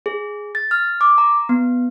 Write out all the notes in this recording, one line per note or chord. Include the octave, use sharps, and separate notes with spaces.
G#4
A6
F6
D6
A#5
B3